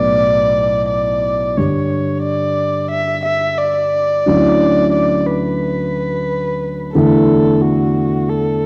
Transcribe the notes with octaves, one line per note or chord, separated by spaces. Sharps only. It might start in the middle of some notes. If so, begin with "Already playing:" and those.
Already playing: B1 A2 F#3 B3 D5
D5
G2 D3 G3 C#5
D5
E5
E5
D5
D2 D3 F#3 C#4 E4
D5
B4
E2 D3 A3 E4 A4
F#4
A4